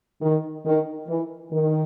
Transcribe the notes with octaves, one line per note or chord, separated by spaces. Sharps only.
D#3
D#3
E3
D#3